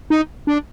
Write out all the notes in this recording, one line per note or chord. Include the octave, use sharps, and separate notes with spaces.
D#4
D4